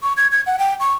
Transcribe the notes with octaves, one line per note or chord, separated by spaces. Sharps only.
C#6
G#6
G#6
F#5
G5
C#6